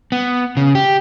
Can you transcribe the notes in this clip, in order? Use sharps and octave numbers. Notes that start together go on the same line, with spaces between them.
B3
C#3
G4